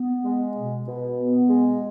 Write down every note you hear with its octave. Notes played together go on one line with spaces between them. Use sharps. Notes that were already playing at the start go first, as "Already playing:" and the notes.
Already playing: B3
G#3
B2
B2
B3
G#3